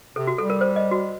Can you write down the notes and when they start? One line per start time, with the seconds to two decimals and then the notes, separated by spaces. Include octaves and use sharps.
0.16 C3 A4
0.27 F#4
0.38 G3 A4
0.50 A#4
0.61 C5
0.76 D#5
0.91 F#4